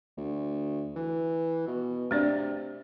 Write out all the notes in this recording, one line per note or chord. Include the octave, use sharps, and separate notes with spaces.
D2
E3
B2
C3 A3 D4 D5